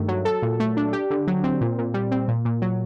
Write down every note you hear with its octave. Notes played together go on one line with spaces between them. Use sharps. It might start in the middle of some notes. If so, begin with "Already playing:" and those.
Already playing: G2 D#3 A3
F#3
A4
A#2
A3
D4
G4
D3
F#3
C4
A#2
A#2
G3
C4
A#2
A#2
F#3